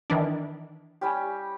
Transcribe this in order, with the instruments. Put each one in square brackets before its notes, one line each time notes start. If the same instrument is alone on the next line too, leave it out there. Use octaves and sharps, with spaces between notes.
[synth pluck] D#3 E3 D4
[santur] G3 C#4 G4